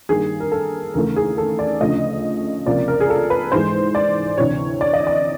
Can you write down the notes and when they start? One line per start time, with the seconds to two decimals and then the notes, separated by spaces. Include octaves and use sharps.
0.09 G2 D#3 G3 A#3 G#4
0.40 A#4
0.52 A4
0.94 D#2 C#3 E3 A3 A#4
1.16 G#4
1.38 A4
1.59 D5
1.81 D2 C#3 F3 A3 D#5
2.66 C#2 C3 F3 A#3 D5
2.88 A#4
3.00 G#4
3.10 A4
3.30 B4
3.52 G#2 E3 G#3 C5
3.95 D5
4.38 D2 C3 E3 C#5
4.81 D5
4.93 D#5
5.07 D5